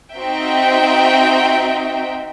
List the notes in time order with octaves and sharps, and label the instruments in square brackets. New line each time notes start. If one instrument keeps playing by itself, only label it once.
[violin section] C4 D#4 F#4 E5 G5